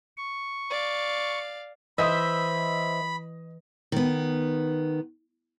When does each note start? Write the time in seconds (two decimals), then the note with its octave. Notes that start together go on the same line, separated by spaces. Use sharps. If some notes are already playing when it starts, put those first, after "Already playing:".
0.17 C#6
0.70 D5 F5
1.98 E3 C5 D#5 E5 B5 D#6
3.92 D#3 B3